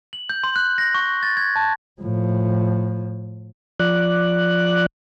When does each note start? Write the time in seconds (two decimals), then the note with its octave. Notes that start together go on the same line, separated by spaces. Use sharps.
0.13 F#7
0.29 G6
0.44 C6
0.56 F#6
0.78 A#6
0.95 C#6
1.23 A6
1.37 G#6
1.56 A5
2.01 A2 F3
3.80 F3 D5 F#6